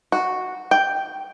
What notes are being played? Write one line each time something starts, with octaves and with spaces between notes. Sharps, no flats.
F#4
G5